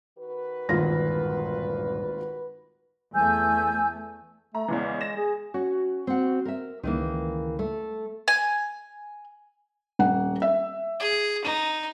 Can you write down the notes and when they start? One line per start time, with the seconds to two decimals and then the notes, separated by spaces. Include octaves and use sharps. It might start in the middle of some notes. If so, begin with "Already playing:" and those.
0.18 D#3 F#4 B4
0.69 G#1 D2 G2 A#2 F4 A#6
3.14 E2 A3 G#5 E6 G6
4.55 A3 A#5
4.68 E2 C#3 E3 G#3
5.01 A#6 E7
5.17 G#4
5.54 C#4 F#4
6.07 C4 F#5
6.45 A#4 E5
6.83 C#2 D#3 E3 A#3
7.59 A3
8.28 G#5
9.99 D#1 F#5
10.42 E5
11.00 G#4
11.45 D#4 D#7